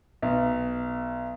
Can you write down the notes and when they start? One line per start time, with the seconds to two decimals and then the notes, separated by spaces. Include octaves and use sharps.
0.22 B1